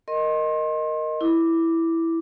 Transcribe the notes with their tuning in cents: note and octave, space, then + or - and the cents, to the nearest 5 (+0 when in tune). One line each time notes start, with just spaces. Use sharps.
A#4 +0 D#5 +0 C6 +35
E4 +0 D6 +0